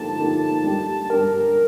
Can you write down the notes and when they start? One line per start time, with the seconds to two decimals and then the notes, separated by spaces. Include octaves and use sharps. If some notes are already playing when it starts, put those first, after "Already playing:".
Already playing: D3 F3 A#3 D#4 G4 A5
0.17 D3 F3 A#3 D#4 G4
0.64 G3 D4 G4
1.10 G3 D4 G4 A#4